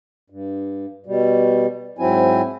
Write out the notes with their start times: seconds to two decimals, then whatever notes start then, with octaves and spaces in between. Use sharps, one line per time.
0.30 G2
1.06 B2 G3
1.99 G#2 F#3 C4 E4 G#5